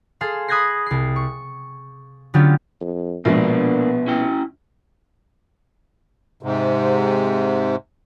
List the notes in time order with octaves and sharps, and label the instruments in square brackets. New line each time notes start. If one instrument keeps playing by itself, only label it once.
[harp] G#4 A4 F5 C6
B5 D#6 F#6 G#6 A#6 C7
C2 C7
C#6
D3 F#3 B3 C#4 F4 G4
[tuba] F2
[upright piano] A#1 B2 G#3 [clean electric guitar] A#3 D4 [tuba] B3
[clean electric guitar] C#4 E4 G5
[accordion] G#2 C3